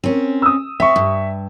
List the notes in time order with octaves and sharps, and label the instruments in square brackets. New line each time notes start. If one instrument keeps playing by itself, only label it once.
[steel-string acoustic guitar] C4 C#4 [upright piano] A#4
[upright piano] D#6 E6
[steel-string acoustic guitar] C4 [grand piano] E5 C#6
[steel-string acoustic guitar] G2